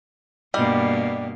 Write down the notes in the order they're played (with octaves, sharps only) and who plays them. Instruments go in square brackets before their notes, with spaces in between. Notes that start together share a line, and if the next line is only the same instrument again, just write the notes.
[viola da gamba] G2 B2 A#3 [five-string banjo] G3 G#3